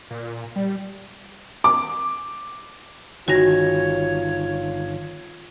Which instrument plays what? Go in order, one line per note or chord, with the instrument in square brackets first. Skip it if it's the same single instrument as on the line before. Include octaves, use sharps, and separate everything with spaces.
[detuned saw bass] A#2
G3
[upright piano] D6
[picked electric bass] G1 D#3 [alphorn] F4 [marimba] F#4 A#6 [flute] C#5